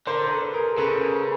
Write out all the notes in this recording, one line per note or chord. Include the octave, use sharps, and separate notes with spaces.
D3 A#4 C5
A#4
A4 B4
G#4 A#4
C#3 A4 B4
G#4 A#4